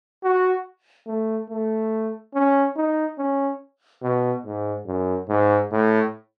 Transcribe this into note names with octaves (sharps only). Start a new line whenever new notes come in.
F#4
A3
A3
C#4
D#4
C#4
B2
G#2
F#2
G#2
A2